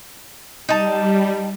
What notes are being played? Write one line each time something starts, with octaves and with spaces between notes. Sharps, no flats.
G3 D#4 A5